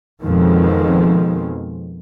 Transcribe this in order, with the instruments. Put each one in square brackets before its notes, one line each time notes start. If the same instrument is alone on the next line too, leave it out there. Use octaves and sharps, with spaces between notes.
[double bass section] F2 B2 D#3 G#3